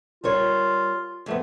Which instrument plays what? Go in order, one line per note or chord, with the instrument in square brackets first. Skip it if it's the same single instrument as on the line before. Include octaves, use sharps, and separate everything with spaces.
[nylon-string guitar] G3 A#4 C#5 [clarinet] F4
[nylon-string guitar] F2 A3 B3